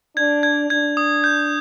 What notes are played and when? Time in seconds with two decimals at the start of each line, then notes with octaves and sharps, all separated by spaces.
0.16 D4 G#6
0.43 G#6
0.70 D4 G#6
0.97 D#6
1.24 G6